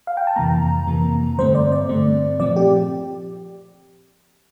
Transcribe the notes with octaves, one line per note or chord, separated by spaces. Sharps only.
F5
G5
A5
F2 C3 E3 A#3 A#5
F2 C3 E3 A#3
G2 D3 A3 C4 C5
D5
D5
G2 D3 A3 C4
A#2 F3 C4 D5
G4